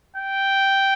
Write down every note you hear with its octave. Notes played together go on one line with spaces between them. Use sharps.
G5